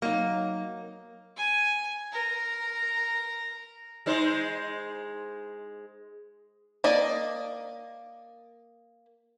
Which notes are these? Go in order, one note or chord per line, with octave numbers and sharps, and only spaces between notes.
F#3 A#3 D#4
G#5
A#4
G#3 D#4 C5
A#3 D5 D#5